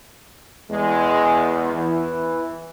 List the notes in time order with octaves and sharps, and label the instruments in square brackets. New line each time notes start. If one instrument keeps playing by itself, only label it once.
[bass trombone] E2 [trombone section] G#3
[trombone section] E3